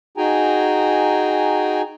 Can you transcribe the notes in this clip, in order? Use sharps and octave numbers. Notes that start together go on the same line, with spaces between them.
D#4 F#4 G#4 G5 G#5 A#5